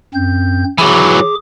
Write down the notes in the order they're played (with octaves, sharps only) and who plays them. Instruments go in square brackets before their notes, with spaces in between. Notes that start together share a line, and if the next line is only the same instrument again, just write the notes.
[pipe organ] F#2 C4 G6
[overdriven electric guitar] E3 F#3 [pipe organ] G#4 D6